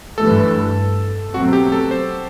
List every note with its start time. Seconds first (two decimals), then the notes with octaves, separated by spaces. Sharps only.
0.18 G2 E3 A3 A4
1.34 B2 F#3 A3 C4 F#4
1.53 G4
1.72 A4
1.91 C5